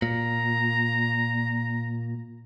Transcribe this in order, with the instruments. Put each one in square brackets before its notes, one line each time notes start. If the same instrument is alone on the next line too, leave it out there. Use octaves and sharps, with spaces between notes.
[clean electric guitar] A#2 [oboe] A#5